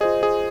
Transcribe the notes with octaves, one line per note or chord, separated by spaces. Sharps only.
F4 G#4 C5 D#5
G#4